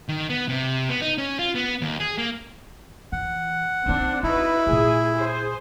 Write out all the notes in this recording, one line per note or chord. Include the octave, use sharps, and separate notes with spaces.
D#3
B3
C3
B3
D#4
C#4
F4
B3
D#2
G#4
A#3
E3 F#5
A#3 C4 D4 D#4
C4 D#4 E4 F#4 B4
A#2 A3 G#4
G#4 C5